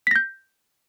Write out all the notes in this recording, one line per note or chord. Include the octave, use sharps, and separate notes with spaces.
G6 A#6 B6